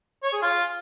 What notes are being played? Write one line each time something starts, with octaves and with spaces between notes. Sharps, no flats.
C#5
G#4
F4